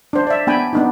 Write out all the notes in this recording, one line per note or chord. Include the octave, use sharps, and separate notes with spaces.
D4 C5
D5 E5
B3 D4 G5 G#5 B5
B3 D4 D#4